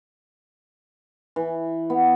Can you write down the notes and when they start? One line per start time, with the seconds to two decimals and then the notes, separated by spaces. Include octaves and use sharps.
1.36 E3
1.90 B3